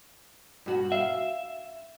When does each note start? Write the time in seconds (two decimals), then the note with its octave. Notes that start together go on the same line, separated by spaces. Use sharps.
0.66 G2 F#4
0.92 E5 F5